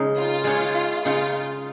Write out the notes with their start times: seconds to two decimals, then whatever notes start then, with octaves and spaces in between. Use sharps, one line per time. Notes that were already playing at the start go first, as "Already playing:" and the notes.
Already playing: C#3 G#3 D#4
0.17 F4
0.44 G#3 D#4 G#4 C#5
1.05 C#3 G#3 D#4 F4 G#4 C#5